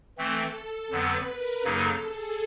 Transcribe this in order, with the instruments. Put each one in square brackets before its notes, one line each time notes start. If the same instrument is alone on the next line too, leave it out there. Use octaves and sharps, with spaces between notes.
[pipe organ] E3 A3 C4 [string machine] A4
[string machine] A4
[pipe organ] F2 D3 F#3 B3 [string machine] B4
[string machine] A#4
[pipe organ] F#2 C#3 F#3 A#3 D#4 [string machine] A4
[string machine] G#4